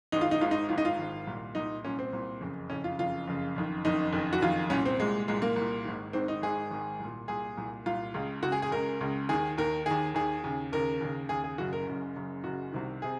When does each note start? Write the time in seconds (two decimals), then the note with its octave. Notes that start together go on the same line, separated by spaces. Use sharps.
0.12 G#1 G#2 D#3 D#4
0.21 F4
0.31 D#4
0.41 G#1 G#2 D#3 F4
0.51 D#4
0.69 G#1 G#2 D#3 F4
0.78 D#4
0.85 F4
0.98 G#1 G#2 D#3
1.27 C2 A#2
1.55 C2 A#2 D#4
1.84 C2 A#2 C#4
1.99 C4
2.13 C2 A#2
2.41 F#1 F2 C#3
2.70 F#1 F2 C#3 C#4
2.84 F4
2.98 F#1 F2 C#3 F4
3.28 F#1 F2 C#3
3.56 F#1 F2 D#3
3.85 F#1 F2 D#3 D#4
4.13 F#1 F2 D#3
4.33 F#4
4.42 F#1 F2 D#3 F4
4.70 C2 A#2 C#4
4.86 C4
4.99 C2 A#2 G#3
5.28 C2 A#2 G#3
5.42 A#3
5.56 C2
5.62 A#2
5.85 G#1 G#2 D#3
6.13 G#1 G#2 D#3 C4
6.28 D#4
6.42 G#1 G#2 D#3 G#4
6.71 G#1 G#2 D#3
7.00 C2
7.05 A#2
7.28 C2 A#2 G#4
7.57 C2 A#2
7.86 C2 A#2 F4
8.14 C#2 C#3
8.43 C#2 C#3 F#4
8.52 G#4
8.62 G#4
8.71 C#2 C#3 A#4
9.01 C#2 C#3
9.29 D#2 D#3 G#4
9.58 D#2 D#3 A#4
9.86 D#2 D#3 G#4
10.14 D#2 D#3 G#4
10.44 D#2 C#3
10.73 D#2 C#3 A#4
11.00 D#2 C#3
11.29 D#2 C#3 G#4
11.44 G#4
11.58 F#1 F#2 C#3 F#4
11.73 A#4
11.87 F#1 F#2 C#3
12.16 F#1 F#2 C#3
12.44 F#1 F#2 C#3 F#4
12.72 C2 C3 D#3
13.02 C3 G#4